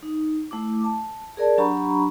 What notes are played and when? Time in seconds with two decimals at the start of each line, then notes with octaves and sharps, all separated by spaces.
0.03 D#4
0.51 A3 E4 D6
0.84 A5
1.37 G#4 A#4 D5 A5
1.58 F#3 D4 G4 A#5 B5 C#6